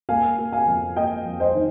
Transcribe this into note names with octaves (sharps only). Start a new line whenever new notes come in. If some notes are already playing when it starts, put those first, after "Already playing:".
A#3 F5 G#5
A#3
F5 G#5
F2
A#3 D#5 G5
F2
C5 D#5
D#3